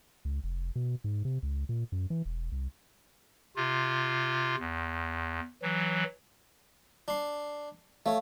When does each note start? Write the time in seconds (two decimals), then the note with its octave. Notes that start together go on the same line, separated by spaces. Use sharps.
0.25 C#2
0.44 F1
0.76 B2
1.04 G#2
1.25 C3
1.43 C#2
1.69 A#2
1.92 F#2
2.10 E3
2.25 E1
2.52 C2
3.56 C3 F4
4.59 E2
5.62 E3 F#3
7.08 D4 C6
8.06 A3 C#5 F5